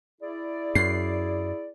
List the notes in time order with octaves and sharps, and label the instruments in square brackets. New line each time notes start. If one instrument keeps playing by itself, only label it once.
[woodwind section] E4 G#4 D5
[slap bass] F#2 [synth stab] C7